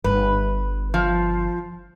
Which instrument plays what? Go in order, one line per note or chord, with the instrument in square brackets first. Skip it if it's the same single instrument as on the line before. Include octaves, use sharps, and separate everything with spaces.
[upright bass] G1 D3 [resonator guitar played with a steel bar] B4
[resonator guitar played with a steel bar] F3